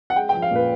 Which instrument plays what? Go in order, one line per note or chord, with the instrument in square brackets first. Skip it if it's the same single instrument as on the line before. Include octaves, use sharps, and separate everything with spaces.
[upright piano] F#5
G#3 G5
F3 G5
F5
A#2 B4